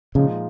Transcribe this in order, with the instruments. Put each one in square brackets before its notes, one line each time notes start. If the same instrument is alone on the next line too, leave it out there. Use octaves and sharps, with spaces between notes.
[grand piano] A#2 F3 G#3 D#4 [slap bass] C#3